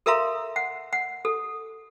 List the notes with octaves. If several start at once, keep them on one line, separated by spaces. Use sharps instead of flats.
A4 A#4 E5 F5 A#5 C6
F#5
F#5
A4